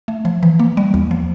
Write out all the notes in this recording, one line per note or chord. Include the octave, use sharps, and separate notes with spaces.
A3
F3
E3
A#3
G3
E2
F3